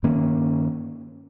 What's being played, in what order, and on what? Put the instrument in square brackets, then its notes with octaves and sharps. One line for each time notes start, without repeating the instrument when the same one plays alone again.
[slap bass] G2 D#3 A#3 C#4